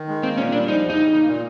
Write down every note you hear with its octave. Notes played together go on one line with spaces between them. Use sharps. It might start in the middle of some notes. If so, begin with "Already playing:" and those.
Already playing: D#3
G#3
A#3 C4
A#2 C#4
G3 D4
F3 D#4
E2
D#4
C#3
A#3
A#2